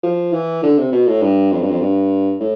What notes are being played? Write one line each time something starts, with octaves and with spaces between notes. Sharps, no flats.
F3
E3
D3
C3
B2
A2
G2
F2
G2
F2
G2
A2